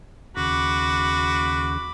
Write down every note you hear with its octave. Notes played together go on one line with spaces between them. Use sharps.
D#2 C#3 F#4 B5 D6